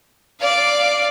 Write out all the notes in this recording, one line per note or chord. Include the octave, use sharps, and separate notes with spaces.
D5 F5